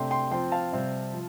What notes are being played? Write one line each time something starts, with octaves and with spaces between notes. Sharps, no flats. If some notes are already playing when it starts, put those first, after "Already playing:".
Already playing: C3 A3 D4 G5 C6
G5 C6
F3 C4 G5 C6
F5 A5
C3 G3 C4
F3